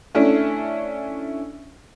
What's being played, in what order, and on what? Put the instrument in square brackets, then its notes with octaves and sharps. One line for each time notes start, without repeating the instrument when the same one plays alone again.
[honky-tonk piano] A3 C#4 D4 E4